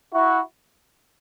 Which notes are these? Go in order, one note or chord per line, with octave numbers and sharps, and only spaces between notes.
E4 F#4